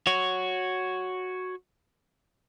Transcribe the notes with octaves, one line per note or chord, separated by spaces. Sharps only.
F#4 C#5